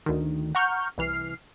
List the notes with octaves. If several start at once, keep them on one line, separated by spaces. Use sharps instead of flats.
D2 D#3
F#5 A#5 C#6 F6 G6
C2 E3 F6 C7